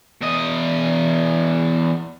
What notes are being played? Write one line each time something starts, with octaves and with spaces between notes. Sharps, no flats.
E2 D#5